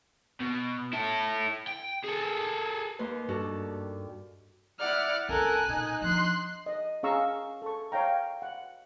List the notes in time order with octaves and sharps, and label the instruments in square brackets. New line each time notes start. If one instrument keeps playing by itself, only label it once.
[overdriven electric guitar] B2
E4 A4
G5
G#4 A4
[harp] D#2 A#3 C6 [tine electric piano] B4
[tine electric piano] G2 [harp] G3 F#4 A4
[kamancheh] E4 D5 [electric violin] F#5 F6
[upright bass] C2 C#4 [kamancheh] A4 A#4 [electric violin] G#5 F#6
[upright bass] A#2 C#3 [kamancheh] D#4
[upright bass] F3 D4 [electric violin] C6 F#6
[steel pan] D#5
C#4 G#4 F5 A#5 C#6 E6
A4 C#6
C#5 F5 G5 A#5
F#5